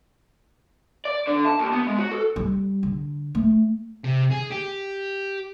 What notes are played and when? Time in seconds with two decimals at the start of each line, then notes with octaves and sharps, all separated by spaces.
1.05 D5
1.27 D3
1.46 A5
1.59 D#2
1.72 B3
1.87 G#3
1.98 F#4
2.11 A4
2.36 G3
2.83 D3
3.35 A3
4.04 C3
4.30 G#4
4.51 G4